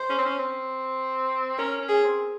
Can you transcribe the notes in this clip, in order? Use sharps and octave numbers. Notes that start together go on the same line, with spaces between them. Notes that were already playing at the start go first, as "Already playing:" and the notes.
Already playing: C5
C#4
C4
C#4
C4
C#4 A#4
C#4
G#4
C4